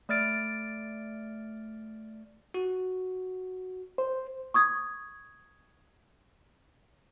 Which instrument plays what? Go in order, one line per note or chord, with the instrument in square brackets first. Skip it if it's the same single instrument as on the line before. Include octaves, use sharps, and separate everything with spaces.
[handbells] A3 D5 F6 A6 D7
[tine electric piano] F#4
[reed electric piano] C5
[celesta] C#6 D#6 G#6